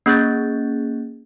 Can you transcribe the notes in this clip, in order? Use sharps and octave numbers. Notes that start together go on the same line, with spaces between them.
A#3 C#4 G#4 F#6 G6 A6